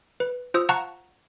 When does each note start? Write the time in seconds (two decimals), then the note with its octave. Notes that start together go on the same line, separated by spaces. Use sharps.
0.20 B4
0.54 F4 C5 D#6 E6
0.69 F5 F#5 A5 A#5 C#6 F#6